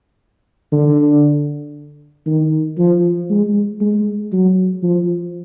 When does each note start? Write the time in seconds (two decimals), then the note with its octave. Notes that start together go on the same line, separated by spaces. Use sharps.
0.72 D3
2.26 D#3
2.78 F3
3.30 G#3
3.81 G#3
4.32 F#3
4.83 F3